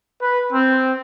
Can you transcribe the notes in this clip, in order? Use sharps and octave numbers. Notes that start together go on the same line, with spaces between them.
B4
C4